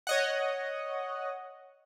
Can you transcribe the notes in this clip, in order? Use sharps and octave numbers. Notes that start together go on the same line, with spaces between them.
C#5 D#5 F#5